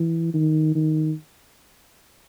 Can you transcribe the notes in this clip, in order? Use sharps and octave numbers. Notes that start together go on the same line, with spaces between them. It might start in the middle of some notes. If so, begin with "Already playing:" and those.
Already playing: E3
D#3
D#3